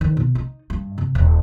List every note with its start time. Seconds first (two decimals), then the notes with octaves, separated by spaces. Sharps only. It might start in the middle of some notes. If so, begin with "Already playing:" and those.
0.01 D#3
0.17 B2
0.35 D#4
0.70 G2
0.98 C3
1.15 D#1